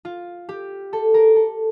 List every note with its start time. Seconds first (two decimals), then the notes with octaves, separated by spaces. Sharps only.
0.05 F4
0.49 G4
0.93 A4
1.14 A#4
1.36 A4